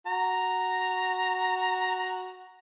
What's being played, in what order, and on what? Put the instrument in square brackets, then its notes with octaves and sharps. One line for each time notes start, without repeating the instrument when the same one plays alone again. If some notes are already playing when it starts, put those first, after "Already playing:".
[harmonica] F#4 A#5